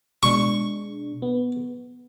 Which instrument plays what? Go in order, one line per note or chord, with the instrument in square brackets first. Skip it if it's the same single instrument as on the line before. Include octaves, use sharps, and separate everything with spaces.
[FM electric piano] B2 G#3 D4 [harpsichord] C#6
[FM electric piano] B3